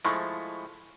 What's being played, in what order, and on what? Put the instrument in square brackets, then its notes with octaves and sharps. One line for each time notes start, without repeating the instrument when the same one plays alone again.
[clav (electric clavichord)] F3 G#3 A3 [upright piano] E4 B5 C#6